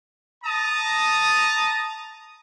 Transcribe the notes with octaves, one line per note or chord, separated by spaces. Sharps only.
A5 A#5 D#6